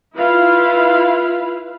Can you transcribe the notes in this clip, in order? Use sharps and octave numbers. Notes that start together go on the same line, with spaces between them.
E4 F4 B4 F5